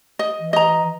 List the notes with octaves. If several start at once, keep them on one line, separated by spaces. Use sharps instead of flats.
D#5
E3
D#5 A#5